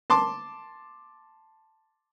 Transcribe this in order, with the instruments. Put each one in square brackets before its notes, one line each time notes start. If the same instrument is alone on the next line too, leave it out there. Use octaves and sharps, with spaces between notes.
[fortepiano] A5 C6 D6